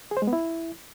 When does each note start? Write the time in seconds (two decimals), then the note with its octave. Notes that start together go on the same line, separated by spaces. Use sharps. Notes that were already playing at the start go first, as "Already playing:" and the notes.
0.11 G#4
0.17 C5
0.22 G#3
0.27 B3
0.33 E4